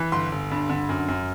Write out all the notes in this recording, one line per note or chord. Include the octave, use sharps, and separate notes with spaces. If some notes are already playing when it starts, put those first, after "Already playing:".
Already playing: E3
G1 C6
G1
G2
D3
F#2
F#2